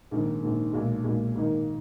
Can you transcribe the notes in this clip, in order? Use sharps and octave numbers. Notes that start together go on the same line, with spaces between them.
A#1 G#2 D#3
A#1 G#2 D#3
B1 A#2 G#3
B1 A#2 G#3
G#2 D#3 A#3 D#4 A#4